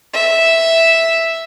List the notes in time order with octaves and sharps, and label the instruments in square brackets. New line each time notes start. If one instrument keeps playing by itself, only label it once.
[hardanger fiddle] E5